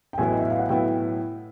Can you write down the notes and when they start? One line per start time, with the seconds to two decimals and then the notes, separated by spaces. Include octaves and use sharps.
0.13 G5
0.18 A1 A2 F#3 B3 E4 G#5
0.31 D#5
0.41 E5
0.50 F5
0.59 F#5
0.69 A2 F#3 B3 E4 G5